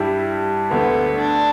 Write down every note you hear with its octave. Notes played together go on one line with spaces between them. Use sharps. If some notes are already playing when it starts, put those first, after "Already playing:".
Already playing: G2 G3 E4 G4
D2 D3 A3 B3
D4